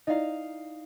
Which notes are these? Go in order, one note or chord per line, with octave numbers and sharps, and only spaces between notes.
D#4 E4 D5 D#5 F5